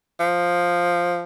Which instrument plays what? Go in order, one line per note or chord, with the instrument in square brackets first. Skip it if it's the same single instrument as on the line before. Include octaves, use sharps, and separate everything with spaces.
[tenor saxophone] F3